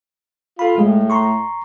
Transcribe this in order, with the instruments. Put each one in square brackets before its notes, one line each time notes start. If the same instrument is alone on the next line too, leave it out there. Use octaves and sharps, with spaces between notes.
[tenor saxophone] F4 [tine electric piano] A4 B5
[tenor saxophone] A2 [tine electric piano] G#3 G#4
[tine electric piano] A#5 C6 C#6